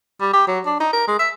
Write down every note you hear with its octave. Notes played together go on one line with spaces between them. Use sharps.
G3
G4
F#3
D4
D#4
A#4
G#3
E5